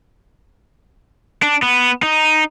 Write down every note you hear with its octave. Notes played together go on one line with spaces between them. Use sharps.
D4
B3
D#4